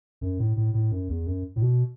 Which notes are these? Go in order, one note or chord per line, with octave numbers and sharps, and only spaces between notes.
F#2
A2
A2
A2
F#2
E2
F#2
A2
B2